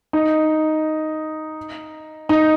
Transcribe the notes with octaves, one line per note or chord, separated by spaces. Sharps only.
D#4
D#4